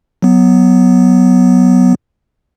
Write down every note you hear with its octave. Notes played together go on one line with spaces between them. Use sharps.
F#3 B3